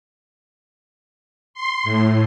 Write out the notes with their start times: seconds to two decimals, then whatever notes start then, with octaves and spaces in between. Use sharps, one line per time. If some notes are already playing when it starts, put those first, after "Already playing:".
1.54 C6
1.84 A2